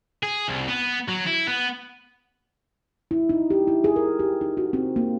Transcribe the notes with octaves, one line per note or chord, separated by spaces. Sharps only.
G#4
C2
B3
F#3
E4
B3
E4
D#4
G4
E4
G#4
A#4
G4
D#4
F#4
C4
A#3